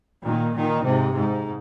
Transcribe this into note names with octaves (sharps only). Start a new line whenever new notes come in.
A#2 D#3
A#2 D#3
G#2 C3
G#2